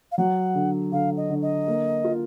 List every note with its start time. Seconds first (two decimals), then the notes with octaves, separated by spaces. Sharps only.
0.12 F5
0.18 F#3 F#5
0.55 D3
0.92 D3 F5
1.17 D#5
1.30 D3
1.42 D#5
1.67 A#3
2.05 F4